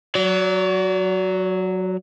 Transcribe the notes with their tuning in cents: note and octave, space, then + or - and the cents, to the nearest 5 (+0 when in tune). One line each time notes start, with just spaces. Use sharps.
F#3 +0 D5 -40